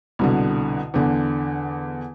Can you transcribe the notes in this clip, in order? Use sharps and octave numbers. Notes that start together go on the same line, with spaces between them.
C2 B2 D3
E2 D3